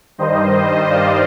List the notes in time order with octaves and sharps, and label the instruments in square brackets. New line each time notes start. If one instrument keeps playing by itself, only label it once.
[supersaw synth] G2 D#3 G3 C5 D#5
D5 F5